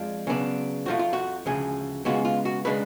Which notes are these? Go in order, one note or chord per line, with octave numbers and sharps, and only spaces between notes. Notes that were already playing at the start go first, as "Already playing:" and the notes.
Already playing: F2 F3 G#3 D4 F4
C#3 F#3 B3 D4
F2 F3 A3 F4 F#4
F4
F#4
D2 C#3 F3 G#4
C#3 G#3 B3 F4 F#4
F4
F#4
C#3 G#3 D4 B4